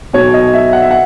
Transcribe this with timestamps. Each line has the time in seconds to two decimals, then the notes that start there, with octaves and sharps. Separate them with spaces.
0.13 B1 B2 C#5
0.34 D#5
0.53 E5
0.73 F#5
0.82 E5
0.91 F#5